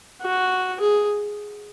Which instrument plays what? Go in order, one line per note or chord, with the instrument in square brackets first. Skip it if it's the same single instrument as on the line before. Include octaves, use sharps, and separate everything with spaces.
[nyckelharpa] F#4
G#4